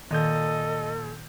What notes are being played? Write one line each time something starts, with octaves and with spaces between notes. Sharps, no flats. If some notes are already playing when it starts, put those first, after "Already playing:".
A#2 D#3 A4 D#5 G6